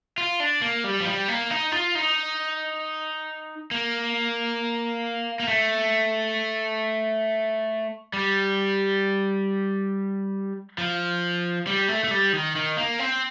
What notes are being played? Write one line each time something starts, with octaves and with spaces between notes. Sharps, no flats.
F4
D4
A#3
G3
F3
G3
A#3
D#4
F4
D#4
A#3
A#3
A3
G3
F3
G3
A3
A3
G3
D#3
D#3
A#3
C4